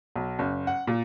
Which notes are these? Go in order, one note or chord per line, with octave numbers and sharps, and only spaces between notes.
B1
F#1
F#5
A#2